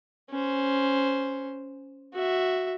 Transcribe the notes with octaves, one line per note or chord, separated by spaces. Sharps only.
C#4 C5
F#4 E5